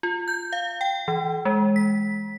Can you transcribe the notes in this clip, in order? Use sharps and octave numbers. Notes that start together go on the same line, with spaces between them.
F4
G6
F5
G5
E3
G#3
B6